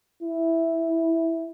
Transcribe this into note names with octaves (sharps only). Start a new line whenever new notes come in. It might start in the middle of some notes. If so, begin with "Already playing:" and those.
E4